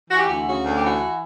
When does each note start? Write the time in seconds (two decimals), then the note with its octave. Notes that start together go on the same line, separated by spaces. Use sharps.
0.10 E3 F#4
0.17 G4
0.26 D2 F#4
0.46 C#3 F#4
0.64 D2
0.75 G4
0.82 E3 F#4